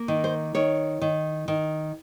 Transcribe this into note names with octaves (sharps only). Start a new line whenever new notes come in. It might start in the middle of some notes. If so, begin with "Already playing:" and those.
Already playing: A#3
D#3
C5
D#3 C#5
D#3
D#3